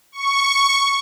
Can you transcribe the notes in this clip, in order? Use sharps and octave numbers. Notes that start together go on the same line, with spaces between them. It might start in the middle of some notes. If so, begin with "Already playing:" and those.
C#6